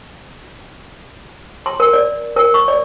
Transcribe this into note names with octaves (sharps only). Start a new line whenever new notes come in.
C6
A#4
D5
A#4
C#6
D5